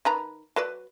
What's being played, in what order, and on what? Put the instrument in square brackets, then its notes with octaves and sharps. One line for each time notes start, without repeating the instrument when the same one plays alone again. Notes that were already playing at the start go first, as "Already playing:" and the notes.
[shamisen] D#3 B4 A#5
F#3 B4 D5